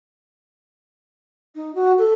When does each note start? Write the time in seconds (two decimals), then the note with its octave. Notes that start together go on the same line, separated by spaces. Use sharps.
1.55 D#4
1.75 F#4
1.98 A4